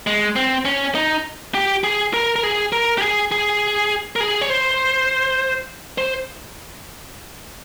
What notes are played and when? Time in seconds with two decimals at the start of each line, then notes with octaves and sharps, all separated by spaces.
0.07 G#3
0.36 C4
0.65 C#4
0.95 D#4
1.54 G4
1.84 G#4
2.14 A#4
2.36 A#4
2.43 G#4
2.72 A#4
2.98 G4
3.02 G#4
3.32 G#4
4.16 A#4
4.20 G#4
4.41 C#5
4.50 C5
5.98 C5